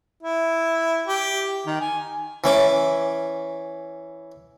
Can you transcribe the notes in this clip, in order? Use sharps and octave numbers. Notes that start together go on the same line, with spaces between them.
E4
G4
D#3
G#5
E3 C#4 D6